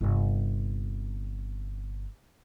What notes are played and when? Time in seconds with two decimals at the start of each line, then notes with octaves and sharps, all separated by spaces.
0.01 G1 C3